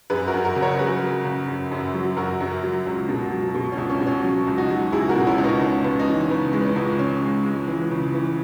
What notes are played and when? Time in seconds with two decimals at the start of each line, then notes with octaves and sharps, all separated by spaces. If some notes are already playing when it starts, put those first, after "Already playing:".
0.10 F#2 G#4 B4
0.28 F#4 A#4
0.34 F#2
0.45 F#4 A#4
0.56 C#3
0.62 A#4 C#5
0.79 F#3 G#4 B4
1.03 F#3
1.25 C#3
1.48 F#2
1.72 F#2
1.94 F#3
2.17 F#2 F#4 A#4
2.41 F#2
2.63 F#3
2.86 C#2
3.09 B2
3.32 F#3
3.54 B2
3.72 C#4
3.78 C#2
3.90 C#4
4.01 B2
4.07 C#4
4.24 F#3
4.47 C#2
4.58 D#4 F#4
4.70 F#3
4.92 C#2 E4 G#4
5.09 F#4 A#4
5.15 B2
5.27 C#4 E4
5.38 C#2
5.44 B3 D#4
5.61 C#2 C#4
5.84 C#2 B3
5.99 D#4
6.07 E3 C#4
6.30 C#3 B3
6.53 G#3
6.60 B3
6.65 C#4
6.76 C#2
6.99 C#3 C#4
7.22 G#3
7.45 G#3
7.68 E3
7.91 C#3
8.14 E3